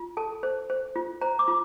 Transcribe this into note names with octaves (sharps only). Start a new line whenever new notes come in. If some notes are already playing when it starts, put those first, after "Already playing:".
Already playing: F4
A4 A5
C5
C5
F4
C5 A#5
D6
F4